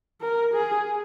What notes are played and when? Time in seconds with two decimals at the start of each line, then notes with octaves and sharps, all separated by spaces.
0.21 A#4
0.54 G#4